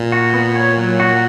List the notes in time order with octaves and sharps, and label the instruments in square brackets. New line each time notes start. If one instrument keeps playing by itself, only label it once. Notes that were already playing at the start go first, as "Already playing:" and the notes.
Already playing: [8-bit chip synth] A#2
[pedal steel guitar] F#4
B3
C#5
F#3
F#4